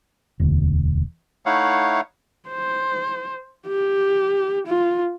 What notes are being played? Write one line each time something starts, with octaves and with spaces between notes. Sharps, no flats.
E1 D2
A3 D#4 E4 C#5 F5 F#5
C5
G4
F4